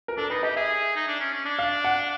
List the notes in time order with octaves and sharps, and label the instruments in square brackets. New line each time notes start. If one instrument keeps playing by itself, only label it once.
[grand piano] A#4
[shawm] D4 [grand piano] A4
[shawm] D#4 [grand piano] B4
[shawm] G4 [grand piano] D#5
[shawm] G#4 [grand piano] E5
[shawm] D#4
D4
C#4
C#4
D4
[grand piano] F5
F#5